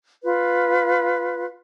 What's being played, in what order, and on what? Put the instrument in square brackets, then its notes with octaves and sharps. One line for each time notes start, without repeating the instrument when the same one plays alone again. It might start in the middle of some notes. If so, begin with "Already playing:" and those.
[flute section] F4 B4